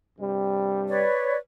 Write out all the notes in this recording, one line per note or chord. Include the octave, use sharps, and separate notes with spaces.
G2 C3 G3
B4 C#5 D5